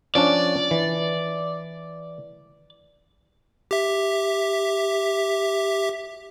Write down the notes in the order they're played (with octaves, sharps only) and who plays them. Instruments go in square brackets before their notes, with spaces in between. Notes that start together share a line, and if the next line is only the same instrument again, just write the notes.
[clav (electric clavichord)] F3 C#4 D4 [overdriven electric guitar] D5
[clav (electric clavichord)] E3
[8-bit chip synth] G4 E5